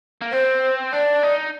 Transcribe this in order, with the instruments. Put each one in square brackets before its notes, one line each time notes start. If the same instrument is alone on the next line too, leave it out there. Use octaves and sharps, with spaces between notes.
[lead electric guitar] A#3
[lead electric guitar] C4 [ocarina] C5
[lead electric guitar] D4 [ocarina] D5
[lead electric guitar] D#4